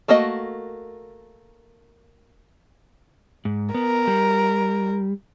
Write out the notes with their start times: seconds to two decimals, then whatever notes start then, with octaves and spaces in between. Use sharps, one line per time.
0.08 A3 A#3 F#4 D#5
3.45 G#2
3.74 B3 A#4
4.07 G3